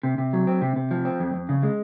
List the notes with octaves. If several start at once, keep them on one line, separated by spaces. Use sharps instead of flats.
C3
C3
F#3
C4
C3
C3
F3
C4
F2
F2
C#3
G#3